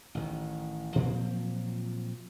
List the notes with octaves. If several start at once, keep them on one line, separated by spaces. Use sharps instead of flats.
A1 D#3
A#2 F3 F#3 C4